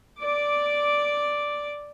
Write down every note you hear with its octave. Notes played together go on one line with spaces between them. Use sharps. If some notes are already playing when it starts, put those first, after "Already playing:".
D5 D6